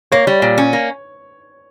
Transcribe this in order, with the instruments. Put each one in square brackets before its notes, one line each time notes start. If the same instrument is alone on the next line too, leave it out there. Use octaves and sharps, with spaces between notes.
[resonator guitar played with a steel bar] A#3 [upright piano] C#5
[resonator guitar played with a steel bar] G3
A#2
C#4
A#3